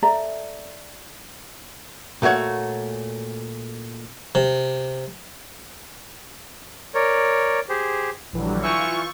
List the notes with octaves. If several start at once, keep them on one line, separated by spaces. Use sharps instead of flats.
A4 D5 E5 A#5
A#2 A3 F#4 C#5 F#5
C3
A#4 C#5 D5
G4 G#4 C5
A#1 D3 E3 F#3 G3
E3 F4 C#6 E6 G6